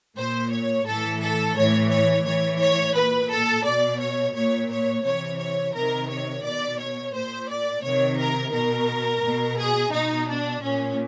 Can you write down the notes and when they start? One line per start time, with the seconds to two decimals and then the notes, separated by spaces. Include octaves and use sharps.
0.17 A#2 C5
0.51 C#5
0.86 A2 E3 A4
1.21 A4
1.56 A2 E3 C#5
1.90 C#5
2.26 A2 E3 C#5
2.60 C#5
2.95 A#2 B4
3.30 A4
3.64 B2 D5
3.99 C#5
4.35 A#2 C#5
4.70 C#5
5.04 C3 E3 C#5
5.39 C#5
5.74 C3 D#3 A#4
6.10 C#5
6.43 B2 D5
6.79 C#5
7.14 A#2 C5
7.49 D5
7.83 C3 D#3 C#5
8.18 A#4
8.52 B2 A#4
9.22 B2
9.58 G#4
9.92 B2 D#4
10.28 D4
10.62 A#2 C#4